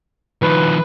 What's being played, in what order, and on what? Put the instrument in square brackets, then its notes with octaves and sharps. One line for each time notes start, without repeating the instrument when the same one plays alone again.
[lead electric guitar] D#3 F3 [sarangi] B4